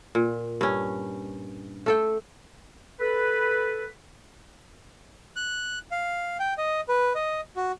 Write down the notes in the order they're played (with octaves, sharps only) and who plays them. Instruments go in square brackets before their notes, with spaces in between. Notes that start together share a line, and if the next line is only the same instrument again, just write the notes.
[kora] A#2
G2 C#4
A3 A4 G5
[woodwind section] A4 B4
[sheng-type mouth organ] F#6
F5
G5
D#5
B4
D#5
F#4